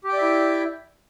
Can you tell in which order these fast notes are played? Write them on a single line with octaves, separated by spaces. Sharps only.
G4 G5 D5 E5 E4